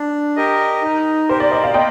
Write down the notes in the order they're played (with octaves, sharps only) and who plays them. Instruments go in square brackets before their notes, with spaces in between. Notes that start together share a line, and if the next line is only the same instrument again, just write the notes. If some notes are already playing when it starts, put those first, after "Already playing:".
Already playing: [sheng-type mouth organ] D4
G4 A#4 D#5
D#4
[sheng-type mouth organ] G4 A#4 [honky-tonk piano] C5
[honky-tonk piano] D5
D#5
F5
[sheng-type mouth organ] A#3 [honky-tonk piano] D#5 G5